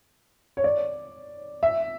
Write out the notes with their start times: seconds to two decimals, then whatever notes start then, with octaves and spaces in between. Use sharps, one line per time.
0.57 C#5
0.64 D5
1.63 E5